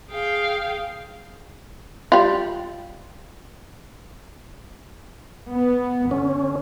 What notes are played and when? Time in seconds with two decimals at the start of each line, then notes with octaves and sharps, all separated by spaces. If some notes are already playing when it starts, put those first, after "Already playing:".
0.10 G#4 F5 G5
2.12 G3 F4
5.50 B3
6.11 D3 C#4